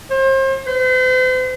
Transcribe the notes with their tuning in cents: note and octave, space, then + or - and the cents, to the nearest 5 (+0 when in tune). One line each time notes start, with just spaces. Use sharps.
C5 +35
C5 -45